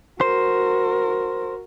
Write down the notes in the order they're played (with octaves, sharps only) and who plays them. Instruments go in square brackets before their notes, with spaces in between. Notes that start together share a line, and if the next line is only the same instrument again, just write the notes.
[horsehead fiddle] F#4 A#4 [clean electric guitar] C5